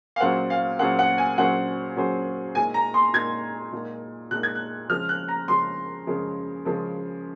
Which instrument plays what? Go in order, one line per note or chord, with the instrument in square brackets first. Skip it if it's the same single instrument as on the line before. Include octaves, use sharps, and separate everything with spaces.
[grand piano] F5
[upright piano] A#2 F#3 C#4 G#4 C5 [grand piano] F#5
[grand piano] F5
[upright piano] A#2 F#3 C#4 G#4 C5 [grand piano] F#5
[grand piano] F#5
G#5
[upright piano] A#2 F#3 C#4 G#4 C5 [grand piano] F#5
[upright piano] A#2 F#3 C#4 G#4 C5
[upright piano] A#2 G#3 D#4 [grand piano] G#5
[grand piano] A#5
C6
[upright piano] A#2 G#3 D#4 [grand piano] G#6
[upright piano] A#2 G#3 D#4
[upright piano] A#2 G#3 D#4 [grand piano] F#6
[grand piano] G#6
F#6
[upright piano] C#3 F3 G#3 [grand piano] F6
[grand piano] F#6
A#5
[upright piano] C#3 F3 G#3 [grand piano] C6
[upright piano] C#3 F3 G#3
C#3 F3 G#3